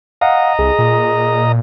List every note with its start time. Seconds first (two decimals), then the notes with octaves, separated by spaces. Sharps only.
0.21 D#5 F5 F#5 A#5
0.59 C2 G#4
0.79 A#2